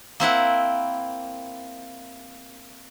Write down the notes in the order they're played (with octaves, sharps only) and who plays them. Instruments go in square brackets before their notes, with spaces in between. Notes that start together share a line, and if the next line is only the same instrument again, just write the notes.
[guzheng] A#3 C4 E4 F#5